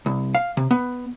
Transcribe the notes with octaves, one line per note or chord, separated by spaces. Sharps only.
C2
F5
C3
B3